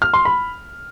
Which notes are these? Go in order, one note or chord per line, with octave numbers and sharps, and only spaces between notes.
F6
C6
B5